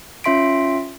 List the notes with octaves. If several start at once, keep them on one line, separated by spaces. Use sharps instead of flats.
C#4 F4 E5 C6 B6 D7